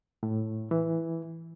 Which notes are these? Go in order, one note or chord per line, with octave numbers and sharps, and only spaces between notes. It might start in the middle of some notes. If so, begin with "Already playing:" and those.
A2
E3